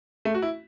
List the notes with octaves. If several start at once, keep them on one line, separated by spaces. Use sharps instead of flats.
A3
F#4
E4